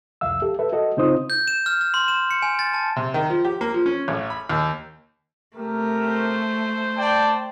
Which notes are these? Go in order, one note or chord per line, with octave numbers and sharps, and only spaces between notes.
C2 F2 E5 F5 E6
G4 A4
A4 B4 E5
F#4 A4 D#5
C#3 C4 D#4 F4 C5 D#6
G6
E7
F6
F6
C6
E7
C#7
G#5
A6
A5
C3
D#3
F3
G4
A#3
F3
C#4
A1
B5
D#2
C3 A3 G4 A#4
C5
D5 G5 A5